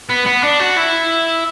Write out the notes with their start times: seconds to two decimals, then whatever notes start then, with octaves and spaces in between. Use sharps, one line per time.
0.09 B3
0.26 B3
0.43 D4
0.60 F#4
0.77 E4